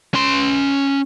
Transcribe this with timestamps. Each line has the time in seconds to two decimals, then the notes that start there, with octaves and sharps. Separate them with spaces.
0.14 C#4 C6